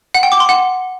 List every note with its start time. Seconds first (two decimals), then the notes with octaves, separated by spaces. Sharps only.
0.14 F#5
0.23 G5
0.32 D6
0.40 C6
0.49 F#5